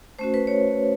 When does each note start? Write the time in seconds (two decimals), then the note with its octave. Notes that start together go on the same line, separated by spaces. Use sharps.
0.19 A3 C#4 F#4 C5
0.34 B4
0.47 C#5